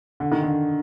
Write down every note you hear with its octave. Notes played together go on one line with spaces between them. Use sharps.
D3
D#3
D3